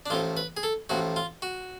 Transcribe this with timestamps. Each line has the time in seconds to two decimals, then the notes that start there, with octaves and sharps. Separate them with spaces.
0.06 D4
0.10 A1 A2 F3 F4
0.37 B4
0.57 G#4
0.63 A4
0.89 A1 A2 F3 F#4
1.16 F4
1.42 F#4